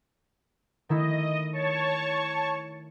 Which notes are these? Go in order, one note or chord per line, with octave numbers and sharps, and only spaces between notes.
D#3 A3 E4 D#5
C#5 A5 C#6